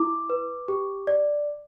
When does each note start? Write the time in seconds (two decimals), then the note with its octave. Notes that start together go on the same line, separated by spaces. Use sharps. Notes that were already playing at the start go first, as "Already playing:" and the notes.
Already playing: E4 D6
0.30 B4
0.68 G4
1.07 D5